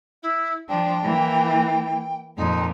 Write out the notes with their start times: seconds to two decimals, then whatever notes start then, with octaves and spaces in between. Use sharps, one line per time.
0.22 E4
0.69 F3 D4 G5
1.03 E3 A#3
2.37 F2 A#2 D#4